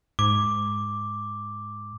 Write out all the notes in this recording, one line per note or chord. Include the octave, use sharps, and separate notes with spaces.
G#2 D6